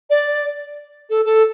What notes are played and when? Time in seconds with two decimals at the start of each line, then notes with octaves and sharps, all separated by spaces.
0.10 D5
1.10 A4
1.25 A4